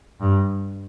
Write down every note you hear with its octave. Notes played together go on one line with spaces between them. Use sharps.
G2